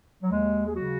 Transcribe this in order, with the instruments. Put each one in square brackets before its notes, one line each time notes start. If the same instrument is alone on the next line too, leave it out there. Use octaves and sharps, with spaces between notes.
[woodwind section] F#3
D#2 G#3
G#4
C#3 F#3 F#4